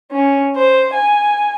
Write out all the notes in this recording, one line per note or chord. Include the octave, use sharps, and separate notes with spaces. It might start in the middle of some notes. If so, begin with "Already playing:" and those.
C#4
C5
G#5